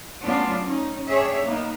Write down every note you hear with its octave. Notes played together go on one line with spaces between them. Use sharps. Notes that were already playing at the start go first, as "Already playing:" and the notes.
F#3 A3 B3 C#4 D4 F4
C#4 D#4
D4 G4 G#4 C#5 E5
A#3 B3 D#4